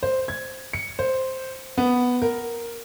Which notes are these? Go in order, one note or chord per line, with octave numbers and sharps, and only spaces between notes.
C5
G#6
C#7
C5
B3
A#4